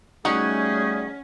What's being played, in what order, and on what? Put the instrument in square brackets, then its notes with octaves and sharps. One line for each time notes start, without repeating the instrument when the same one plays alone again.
[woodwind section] G3 A3 G#4 [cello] C#4 [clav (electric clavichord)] D#4 F#4 [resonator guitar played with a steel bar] F#5